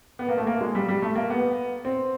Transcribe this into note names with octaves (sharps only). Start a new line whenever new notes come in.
B3
A#3
A3
A#3
G#3
G3
G3
A3
A#3
B3
C4